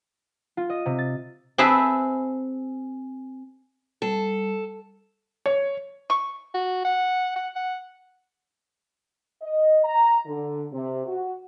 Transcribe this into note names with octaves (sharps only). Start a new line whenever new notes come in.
F4
D#5
C3
A6
C4 G#4 B4 E5 A5
G3 A4
C#5
C#6
F#4
F#5
F#5
F#5
D#5
A#5
D3
C3
F#4